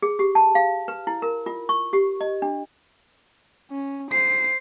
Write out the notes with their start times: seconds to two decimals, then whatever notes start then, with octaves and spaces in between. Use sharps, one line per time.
0.02 G#4
0.19 G4
0.35 A5
0.55 F5
0.88 B4
1.07 E4
1.22 A#4
1.46 F4
1.69 C#6
1.93 G4
2.21 D#5
2.42 D4
3.72 C#4
4.12 C5 C7